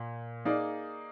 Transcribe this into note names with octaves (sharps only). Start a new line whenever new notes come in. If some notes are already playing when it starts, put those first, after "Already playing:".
Already playing: A#2
A#3 D#4 G#4 D5